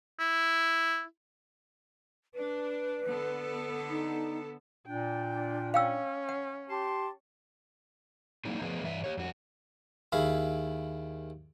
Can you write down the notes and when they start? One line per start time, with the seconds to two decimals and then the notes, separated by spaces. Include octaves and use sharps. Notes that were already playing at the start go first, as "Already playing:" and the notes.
0.19 E4
2.35 D4 B4
3.06 D3 B3 A4
3.90 D#4
4.87 A#2 D4 G5
5.74 C#4 F5 G5 E6
6.29 F#5
6.70 G4 A5 C6
8.45 F#3 A#3 C4 D#4 E4 G#4
8.62 F3 A3 B3 G#4 B4
8.83 G2 E3 E5
9.04 G4 C#5
9.17 F2 F#4
10.12 D#2 E4 G#4 F5 B5